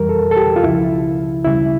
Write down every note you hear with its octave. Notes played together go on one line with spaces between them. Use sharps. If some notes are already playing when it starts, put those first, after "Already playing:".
Already playing: F2 E3 G3 A#4
A4
A4
G4
F4
C#2 C#3 F3 E4
D2 C#3 G3 E4